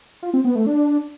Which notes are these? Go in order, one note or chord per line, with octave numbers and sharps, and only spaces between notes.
F4
C4
B3
A3
D4